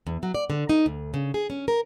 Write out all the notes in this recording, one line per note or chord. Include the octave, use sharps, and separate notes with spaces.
E2
F#3
D5
D3
D#4
D2
C#3
G#4
C#4
A#4